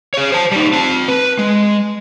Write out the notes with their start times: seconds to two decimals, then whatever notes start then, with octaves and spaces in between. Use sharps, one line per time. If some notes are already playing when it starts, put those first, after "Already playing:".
0.14 G#4 C#5
0.32 C5 A5
0.52 G3 D#4
0.73 C4 A5
1.08 B4
1.39 G#3